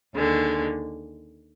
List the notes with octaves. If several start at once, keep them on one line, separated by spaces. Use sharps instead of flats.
D#2 D3 G#3